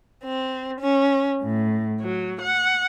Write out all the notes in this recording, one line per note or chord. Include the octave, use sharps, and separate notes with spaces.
C4
C#4
A2
F#3
F#5